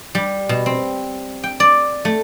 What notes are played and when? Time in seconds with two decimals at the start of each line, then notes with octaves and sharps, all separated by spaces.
0.15 G3
0.49 B2
0.66 C4
1.44 G5
1.60 D5
2.05 A3